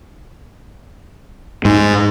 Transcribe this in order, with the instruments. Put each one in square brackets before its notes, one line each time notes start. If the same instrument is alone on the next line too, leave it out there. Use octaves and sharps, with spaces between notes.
[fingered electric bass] G#2